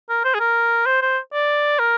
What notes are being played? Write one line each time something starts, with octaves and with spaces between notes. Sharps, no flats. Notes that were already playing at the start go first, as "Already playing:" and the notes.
A#4
C5
G#4
A#4
C5
C5
D5
A#4